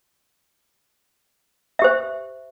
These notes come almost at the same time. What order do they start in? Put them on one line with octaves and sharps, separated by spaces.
E5 G4 C5